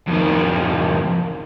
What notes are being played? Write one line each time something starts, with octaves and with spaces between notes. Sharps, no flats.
F2 D#3